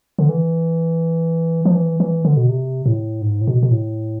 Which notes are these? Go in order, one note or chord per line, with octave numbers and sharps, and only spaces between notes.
D3
E3
F3
E3
E3
D3
B2
C3
A2
G#2
A2
B2
B2
A2